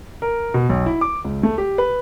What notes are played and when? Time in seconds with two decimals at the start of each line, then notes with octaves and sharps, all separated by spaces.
0.22 A#4
0.54 B2
0.69 B1
0.86 E4
1.01 D6
1.24 C#2
1.43 A3
1.58 G4
1.78 B4